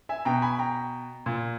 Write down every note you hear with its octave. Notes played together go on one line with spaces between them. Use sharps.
E5 G#5
B2 G5 A#5
G#5 B5
G5 A#5
A#2